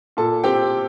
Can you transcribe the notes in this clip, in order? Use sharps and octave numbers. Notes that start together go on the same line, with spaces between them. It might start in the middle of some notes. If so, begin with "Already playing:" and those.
A#2 A4 A5
C4 G4 G5